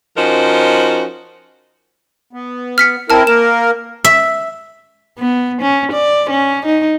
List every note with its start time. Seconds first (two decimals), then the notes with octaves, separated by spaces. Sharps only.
0.17 F3 C#4 D#4 F#4 A#4 C5
2.33 B3
2.78 F6 B6 C#7
3.10 C4 E4 A#4 A5 F6
3.27 A#3 A#4 E7
4.05 E5
5.19 B3
5.62 C#4
5.92 D5
6.30 C#4
6.66 D#4